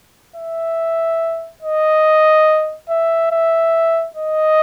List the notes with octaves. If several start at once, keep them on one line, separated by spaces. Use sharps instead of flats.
E5
D#5
E5
E5
D#5